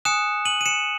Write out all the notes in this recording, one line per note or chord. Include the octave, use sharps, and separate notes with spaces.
G#5 D#6 F#6 C#7 E7
D#7 F#7
D#7
C#7 E7